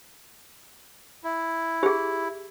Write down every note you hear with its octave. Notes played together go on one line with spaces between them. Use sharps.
E4
G4 G#4